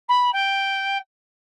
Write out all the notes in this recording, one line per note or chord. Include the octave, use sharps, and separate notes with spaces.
B5
G5